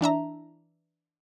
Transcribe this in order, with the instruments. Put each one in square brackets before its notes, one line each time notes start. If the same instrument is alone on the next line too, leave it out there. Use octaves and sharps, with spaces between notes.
[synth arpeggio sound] E3 D4 E5 A#5